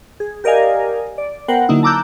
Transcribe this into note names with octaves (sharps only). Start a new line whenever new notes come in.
G#4
G4 A#4 D5 D#5 F5 G#5
D5
B3 A#4 C5 F#5 G5
D3 F#3 A#3 D#4 E4
A5 A#5 D6 E6 F#6 G6